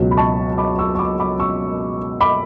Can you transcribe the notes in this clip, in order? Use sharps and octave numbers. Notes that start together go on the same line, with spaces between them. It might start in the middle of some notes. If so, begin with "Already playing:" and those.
Already playing: C#2 B2 F#3
B5
A5 C#6
B5 D6
C#6 E6
C#6
B5 D6
B5 D6
C#6 E6
B5 D6